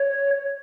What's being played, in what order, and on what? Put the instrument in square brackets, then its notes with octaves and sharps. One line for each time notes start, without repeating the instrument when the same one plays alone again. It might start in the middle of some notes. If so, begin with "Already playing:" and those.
Already playing: [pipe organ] C#5